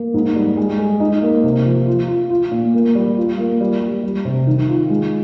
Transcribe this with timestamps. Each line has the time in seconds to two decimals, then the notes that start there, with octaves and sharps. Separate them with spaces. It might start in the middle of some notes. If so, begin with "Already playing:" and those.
Already playing: A#3
0.14 G#2
0.36 G3
0.57 G#3
0.79 G#4
1.00 D#4
1.22 A#3
1.43 C3
1.65 F3
1.87 F4
2.08 F4
2.30 F4
2.52 A#2
2.74 A#3
2.95 G3
3.18 F4
3.38 A#3
3.61 G3
3.82 G3
4.03 G3
4.25 C3
4.47 D#3
4.69 F4
4.90 G#3